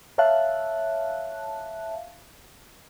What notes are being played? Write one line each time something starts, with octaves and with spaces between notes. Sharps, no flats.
C#5 E5 F5 A5 F#6